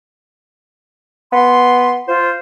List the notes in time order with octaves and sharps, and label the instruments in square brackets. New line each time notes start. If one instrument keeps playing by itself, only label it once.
[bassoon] B3 [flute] C6
[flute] F4 [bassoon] C5